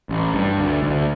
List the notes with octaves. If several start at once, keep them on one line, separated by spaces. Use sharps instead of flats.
A1
G2
D2
D2